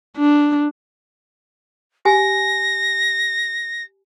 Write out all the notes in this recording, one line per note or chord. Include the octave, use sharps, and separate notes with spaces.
D4
G4 G#5 A#6